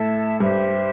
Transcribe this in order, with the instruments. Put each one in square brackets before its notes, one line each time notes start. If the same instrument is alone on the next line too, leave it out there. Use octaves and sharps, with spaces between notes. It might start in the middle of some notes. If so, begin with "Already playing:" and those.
Already playing: [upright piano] A2 [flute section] A4 E5 A5
[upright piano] G2 [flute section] G4 C5 E5